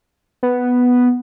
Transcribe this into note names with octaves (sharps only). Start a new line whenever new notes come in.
B3